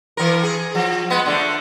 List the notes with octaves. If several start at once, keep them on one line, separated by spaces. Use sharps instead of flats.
E3 A#4
G#4
F3
G#3 B3
D3 A3